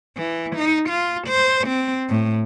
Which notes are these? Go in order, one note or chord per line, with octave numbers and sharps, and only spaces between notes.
E3
D#4
F4
C5
C4
A2